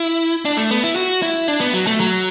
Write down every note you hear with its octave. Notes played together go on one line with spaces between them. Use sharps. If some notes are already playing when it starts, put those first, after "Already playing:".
Already playing: E4
D4
A3
B3
E4
F#4
E4
D4
B3
F#3
A3
F#3